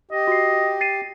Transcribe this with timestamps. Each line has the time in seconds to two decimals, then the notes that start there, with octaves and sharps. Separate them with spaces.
0.11 G4 D#5
0.27 F#4 C7
0.81 A6 C7 D#7